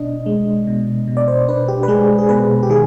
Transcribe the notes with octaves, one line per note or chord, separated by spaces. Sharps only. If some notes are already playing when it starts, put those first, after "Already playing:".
Already playing: B2 D4 D#5
G#3
B2
B2
D5
C5
D4 B4
G4
B4
G#3 G#4
G#4
B2 B4
G4
D#3 G#4